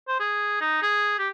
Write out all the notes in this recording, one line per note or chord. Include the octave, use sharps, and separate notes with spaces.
C5
G#4
D#4
G#4
G4